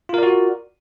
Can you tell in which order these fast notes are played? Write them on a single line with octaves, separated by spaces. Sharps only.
F4 A#4 D5 F#4